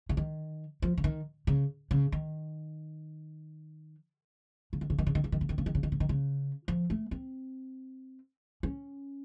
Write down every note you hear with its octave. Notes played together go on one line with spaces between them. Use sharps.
C#3
D#3
F3
C#3
D#3
C#3
C#3
D#3
C#3
D#3
C#3
D#3
C#3
D#3
C#3
D#3
C#3
D#3
C#3
D#3
C#3
D#3
C#3
D#3
C#3
F3
A3
C4
C#4